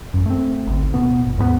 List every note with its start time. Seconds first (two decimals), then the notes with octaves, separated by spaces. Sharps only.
0.14 A1 F#2
0.26 A3 C4
0.67 G#1 D2
0.94 D1 B2 B3
1.25 G1
1.38 D#2 G#2 G3 B3